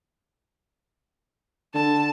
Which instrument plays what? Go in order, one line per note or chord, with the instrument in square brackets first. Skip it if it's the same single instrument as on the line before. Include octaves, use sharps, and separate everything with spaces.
[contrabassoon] D3 [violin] A5